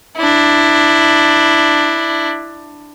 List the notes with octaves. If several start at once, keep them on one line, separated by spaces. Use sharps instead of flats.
D4 E4